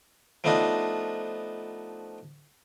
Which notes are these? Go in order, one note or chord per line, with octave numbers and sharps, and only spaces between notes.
F3 A3 B3 D4 D#4 F4